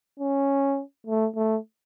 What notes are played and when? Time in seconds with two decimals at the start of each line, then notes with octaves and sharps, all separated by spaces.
0.20 C#4
1.07 A3
1.36 A3